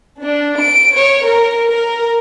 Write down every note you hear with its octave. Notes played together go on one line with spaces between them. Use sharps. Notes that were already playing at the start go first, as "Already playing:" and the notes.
D4
D7
C#5
A#4
A#4